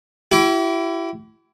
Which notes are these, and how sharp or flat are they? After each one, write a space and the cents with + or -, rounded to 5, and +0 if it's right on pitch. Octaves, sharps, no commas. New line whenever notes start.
E4 +20 G4 -40